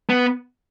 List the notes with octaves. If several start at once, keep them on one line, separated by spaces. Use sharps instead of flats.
B3